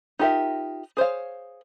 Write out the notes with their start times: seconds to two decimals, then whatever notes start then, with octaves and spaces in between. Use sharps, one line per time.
0.19 D#4 F4 G4 A#4 E5
0.97 G#4 C5 C#5 F5